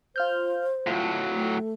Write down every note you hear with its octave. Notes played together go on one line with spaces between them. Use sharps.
F4 C5 F6 G6
A2 F#3 F4
A3